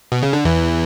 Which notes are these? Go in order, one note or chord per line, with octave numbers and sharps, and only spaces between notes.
B2
C#3
D3
E2 E3